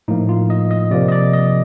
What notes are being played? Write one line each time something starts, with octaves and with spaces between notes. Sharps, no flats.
A2 F3 A#3 D#4
F4
D#5
D#5
C3 F3 A#3 D5
D#5
D5
D#5